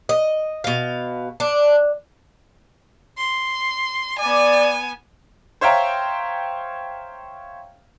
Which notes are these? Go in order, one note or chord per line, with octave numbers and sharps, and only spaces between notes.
D#5
B2 F5
D4
C6
B3 D5 G#5
C5 C#5 E5 F5 G5 A#5